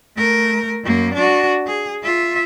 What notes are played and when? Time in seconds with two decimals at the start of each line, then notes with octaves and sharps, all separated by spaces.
0.16 A3 A#4
0.83 F#2 A#3
1.14 D4 F#4
1.66 G#4
2.03 F4 E5